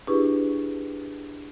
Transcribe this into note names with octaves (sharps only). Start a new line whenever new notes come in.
D4 E4 G4 G#4 B4 C#6